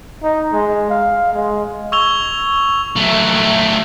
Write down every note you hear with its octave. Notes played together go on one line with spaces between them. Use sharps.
D#4
G#3
F5
G#3
C#6 E6 G#6 F7 G7
F#3 A3